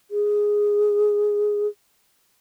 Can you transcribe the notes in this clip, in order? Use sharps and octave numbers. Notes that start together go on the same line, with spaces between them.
G#4